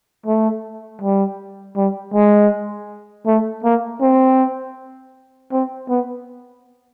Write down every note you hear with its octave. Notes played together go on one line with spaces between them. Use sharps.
A3
G3
G3
G#3
A3
A#3
C4
C4
B3